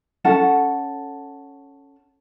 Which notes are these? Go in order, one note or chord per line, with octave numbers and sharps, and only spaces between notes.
C#4 A4 F#5 A5